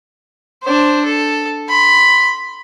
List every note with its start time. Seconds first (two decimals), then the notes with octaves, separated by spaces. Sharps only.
0.63 D4 C5
1.05 A4
1.68 B5 C6